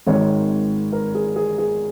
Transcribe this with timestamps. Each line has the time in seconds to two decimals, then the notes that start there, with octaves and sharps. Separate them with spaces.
0.07 G#1 G#2 D#3 G#3 C4 C#5
0.92 A#4
1.15 G#4
1.36 G#4
1.58 G#4